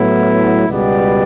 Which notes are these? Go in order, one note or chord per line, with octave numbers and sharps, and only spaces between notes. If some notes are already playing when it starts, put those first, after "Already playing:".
Already playing: A2 F#3 B3 E4
C#2 B2 G3 B3 D5